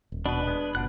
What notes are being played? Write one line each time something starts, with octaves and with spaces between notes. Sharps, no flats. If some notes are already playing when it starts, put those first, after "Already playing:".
D#1
B2 D4 B4
G#3 B3
F#1 B2 F3 D4 F#5 F#6